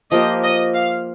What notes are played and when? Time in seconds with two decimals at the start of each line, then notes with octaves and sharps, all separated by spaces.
0.11 F3 A#3 G4 D#5
0.43 D#5
0.73 F5